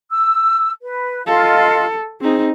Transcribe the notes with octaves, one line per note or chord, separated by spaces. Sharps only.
E6
B4
F4 A4 D#5 F5
C4 D#4 G#4